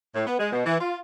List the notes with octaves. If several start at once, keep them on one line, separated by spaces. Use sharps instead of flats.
A2
B3
G#3
B2
E3
F4